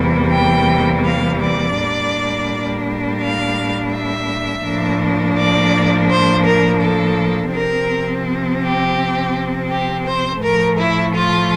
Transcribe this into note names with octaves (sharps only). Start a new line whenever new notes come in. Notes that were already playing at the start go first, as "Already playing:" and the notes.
Already playing: E2 C3 E3 G3 A#3
G5
F5
D5
A2 G3 A#3 D4
F5
E5
A2 F3 A#3 D4
D5
C5
A#4
A4
C3 F3 C4 A#4
G4
G4
C5
A2 F3 A3 A#4
E4
F4